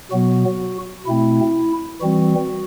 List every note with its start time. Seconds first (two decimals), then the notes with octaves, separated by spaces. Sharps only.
0.11 B2 F#3 B3 F#4
1.06 B2 A3 C4 E4
2.01 E3 G3 C4 F#4